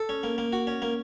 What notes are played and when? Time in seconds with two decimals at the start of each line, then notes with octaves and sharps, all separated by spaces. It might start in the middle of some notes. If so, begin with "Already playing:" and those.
Already playing: A4
0.09 C#4
0.23 A#3
0.38 A#3
0.53 F#4
0.67 C#4
0.82 A#3